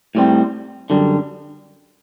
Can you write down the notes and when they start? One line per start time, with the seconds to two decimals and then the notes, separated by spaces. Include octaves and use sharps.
0.15 A2 G3 C4
0.90 F#2 D3 G3